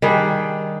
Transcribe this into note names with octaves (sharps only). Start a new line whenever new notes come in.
D#3 G3 D4 G#4